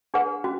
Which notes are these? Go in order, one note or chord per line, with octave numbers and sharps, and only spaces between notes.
D4 G#4 B4 F#5
C#4 F#4